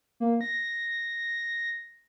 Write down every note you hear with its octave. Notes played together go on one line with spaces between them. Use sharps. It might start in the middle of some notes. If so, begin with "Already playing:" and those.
A#3
A#6